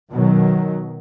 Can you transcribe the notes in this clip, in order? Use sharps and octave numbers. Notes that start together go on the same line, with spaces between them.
B2 D#3 F#3